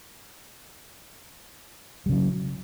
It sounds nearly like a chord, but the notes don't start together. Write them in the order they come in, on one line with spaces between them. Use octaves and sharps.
G3 C#3 F#3